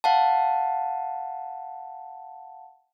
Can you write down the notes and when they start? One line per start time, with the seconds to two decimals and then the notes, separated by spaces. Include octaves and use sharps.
0.04 F5 F#5 A5